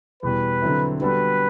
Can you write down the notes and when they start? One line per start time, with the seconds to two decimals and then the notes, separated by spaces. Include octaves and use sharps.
0.23 E2 B2 G3 B4
0.62 D3 F#3 C4 E4
1.01 D3 G3 B3 F#4 A4 B4